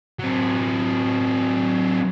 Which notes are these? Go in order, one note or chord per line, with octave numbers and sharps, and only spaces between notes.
F#3 C4